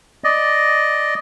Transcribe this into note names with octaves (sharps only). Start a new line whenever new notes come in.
D5 D#5